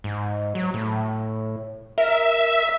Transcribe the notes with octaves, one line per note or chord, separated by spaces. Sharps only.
G#2
F#3
A2
A#4 E5